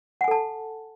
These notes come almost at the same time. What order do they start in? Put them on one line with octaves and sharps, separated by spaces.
F#5 G#5 A4 A5